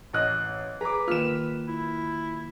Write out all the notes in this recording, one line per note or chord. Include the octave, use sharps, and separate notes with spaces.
A1 D#5 F#6
G#4 B4 A#5 D6
D#3 A#3 F4 F6 E7
E4